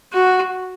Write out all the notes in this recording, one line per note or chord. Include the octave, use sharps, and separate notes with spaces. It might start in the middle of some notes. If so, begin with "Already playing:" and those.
F#4